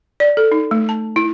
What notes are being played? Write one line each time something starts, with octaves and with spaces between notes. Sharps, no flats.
D5
A4
D#4
A3
A5
E4